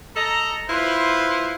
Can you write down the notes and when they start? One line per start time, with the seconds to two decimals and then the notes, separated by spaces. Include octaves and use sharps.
0.16 A4 D#5 A#5
0.70 E4 F4 B4 C5